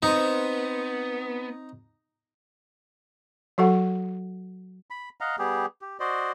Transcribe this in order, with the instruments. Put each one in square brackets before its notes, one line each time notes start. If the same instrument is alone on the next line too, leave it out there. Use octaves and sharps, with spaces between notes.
[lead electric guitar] B3 [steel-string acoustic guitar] C4 C5 [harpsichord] D#4
[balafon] F#3 F#4 A4 F#5
[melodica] B5
D#5 F5 F#5 A#5
G3 B3 G4 G#4
G4
F#4 C5 D5 D#5